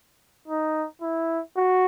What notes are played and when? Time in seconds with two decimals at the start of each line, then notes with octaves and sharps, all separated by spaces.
0.48 D#4
1.02 E4
1.57 F#4